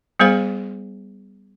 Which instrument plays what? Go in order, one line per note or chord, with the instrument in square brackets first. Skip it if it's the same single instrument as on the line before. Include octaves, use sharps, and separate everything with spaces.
[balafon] G3 B3 G#4 C5 F5